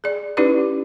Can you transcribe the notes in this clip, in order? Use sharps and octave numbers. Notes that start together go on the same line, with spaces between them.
G#4 D5
C#4 D#4 E4 G4 B4 D5